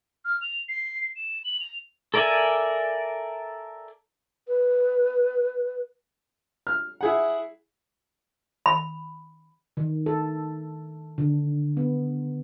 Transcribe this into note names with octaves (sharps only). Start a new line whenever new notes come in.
F6
F7
C7
E7
F#7
F7
A4 A#4 D5 E5 G#5
B4
F6
E4 G#4 F#5
B5
D#3
A4
D3
B3